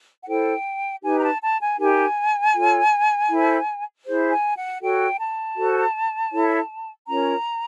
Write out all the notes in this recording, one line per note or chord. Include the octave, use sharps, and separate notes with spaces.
F#5
E4 A4 C5 G5
D#4 G4 B4 G#5
A#5
A5
A5
G#5
D#4 G4 A#4 G#5
F4 A4 C#5
E4 A4 C5
E4 G#4 C5
G#5
F#5
F#4 A4 C#5 G5
A5
F#4 A4 C5
E4 A4 C#5
C#4 F4 A#4 C#5 A#5